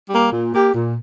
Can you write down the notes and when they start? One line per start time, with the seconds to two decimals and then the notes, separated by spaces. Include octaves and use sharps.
0.09 G3 A#3
0.31 A#2
0.52 A#3 G4
0.73 A#2